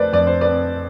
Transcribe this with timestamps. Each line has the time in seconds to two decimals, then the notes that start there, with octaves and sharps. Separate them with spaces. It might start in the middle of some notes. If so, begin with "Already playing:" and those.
Already playing: F2 A3 B4 C5 D5
0.13 F2 D5
0.27 C5
0.41 C4 B4 D5